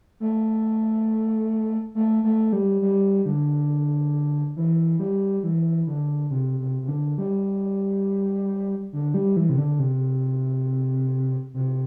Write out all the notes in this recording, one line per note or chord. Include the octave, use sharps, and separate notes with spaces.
A3
A3
A3
G3
G3
D3
E3
G3
E3
D3
C3
C3
C3
D3
G3
D3
G3
E3
C3
D3
C3
C3